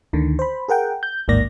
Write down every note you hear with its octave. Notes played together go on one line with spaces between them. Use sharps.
D2 D3 D#3
C5 B5
G#4 A#4 F#5 G5
G6
A1 D#2 G#2 A#3 D5 A#6